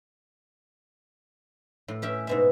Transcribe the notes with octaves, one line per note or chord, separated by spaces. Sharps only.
A2
C#4 G4 E5
G#2 B2 E5